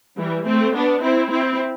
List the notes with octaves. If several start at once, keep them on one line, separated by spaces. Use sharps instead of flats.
E3 G3
A3 C4
B3 D4
C4 E4
C4 E4